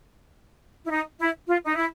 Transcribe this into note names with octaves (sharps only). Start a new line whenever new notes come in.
E4
D#4
E4
F4
D#4
E4